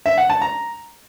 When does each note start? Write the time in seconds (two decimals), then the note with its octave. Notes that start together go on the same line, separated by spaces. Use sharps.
0.06 E5
0.18 F#5
0.30 A5
0.42 A#5